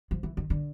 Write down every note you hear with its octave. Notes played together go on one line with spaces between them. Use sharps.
F3
E3
D#3
D3